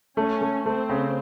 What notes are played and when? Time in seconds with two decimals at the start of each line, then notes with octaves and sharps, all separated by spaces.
0.17 A3 C#4
0.41 A3
0.66 A3 C4
0.89 C#3